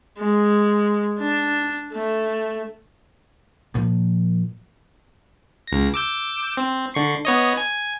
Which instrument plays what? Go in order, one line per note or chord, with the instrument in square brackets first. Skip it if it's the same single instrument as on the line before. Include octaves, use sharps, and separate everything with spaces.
[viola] G#3
D4
A3
[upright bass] A#2 F3
[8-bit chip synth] C#2 A#6
D6 E6 G6
C4
D3 C#6 C7
B3 C#5 D#5
G#5